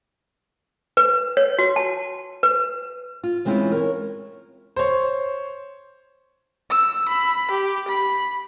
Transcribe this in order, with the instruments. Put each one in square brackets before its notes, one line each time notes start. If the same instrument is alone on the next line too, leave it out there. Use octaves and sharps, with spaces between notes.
[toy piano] B4
C#5
F#4
A5
B4
[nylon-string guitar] F4
E3 G#3 C4 C#4 E4 F4
A#4 C#5
[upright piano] C5 C#5
[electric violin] E6
B5
G4
B5